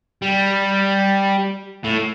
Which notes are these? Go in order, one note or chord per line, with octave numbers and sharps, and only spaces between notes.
G3
A2